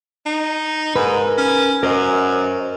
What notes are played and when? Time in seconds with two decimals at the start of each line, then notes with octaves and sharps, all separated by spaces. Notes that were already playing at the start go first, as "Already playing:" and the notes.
0.26 D#4
0.96 G#2 A#4 B4
1.38 C#4
1.83 F#2 A#4 C5 D#5